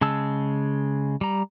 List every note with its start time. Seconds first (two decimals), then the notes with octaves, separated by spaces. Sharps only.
0.01 C#3 G#3 A5 E6
1.21 G3 A#5